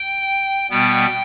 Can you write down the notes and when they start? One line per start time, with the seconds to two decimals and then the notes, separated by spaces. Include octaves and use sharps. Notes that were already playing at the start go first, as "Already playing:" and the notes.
Already playing: G5
0.70 B2 G3 B3 G5